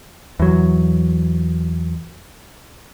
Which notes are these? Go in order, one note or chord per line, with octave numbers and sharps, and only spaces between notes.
E2 F#3